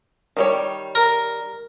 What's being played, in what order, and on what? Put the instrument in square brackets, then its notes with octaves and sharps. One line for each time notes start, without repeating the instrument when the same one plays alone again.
[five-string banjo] D#3 G3 C#5
[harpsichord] A#4